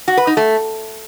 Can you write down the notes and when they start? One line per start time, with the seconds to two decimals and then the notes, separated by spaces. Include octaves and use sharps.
0.08 F#4
0.17 B4
0.27 D#4
0.37 A3